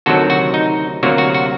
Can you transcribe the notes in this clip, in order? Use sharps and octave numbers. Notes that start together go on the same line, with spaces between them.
D2 C3 D#3 F#3 F#4 A4
F#4
D#4
D2 C3 F#3 A#3 F#4
F#4
F#4